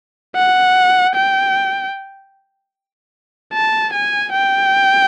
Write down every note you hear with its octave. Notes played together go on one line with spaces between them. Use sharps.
F#5
G5
A5
G#5
G5